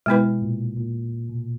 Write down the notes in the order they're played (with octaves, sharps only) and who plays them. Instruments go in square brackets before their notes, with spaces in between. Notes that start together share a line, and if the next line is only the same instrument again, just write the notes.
[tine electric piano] B2 [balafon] G#3 B3 E4 B4
[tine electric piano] A#2
A#2
B2